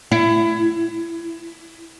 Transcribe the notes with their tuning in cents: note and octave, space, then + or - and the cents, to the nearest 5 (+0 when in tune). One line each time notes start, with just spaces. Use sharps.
E4 +25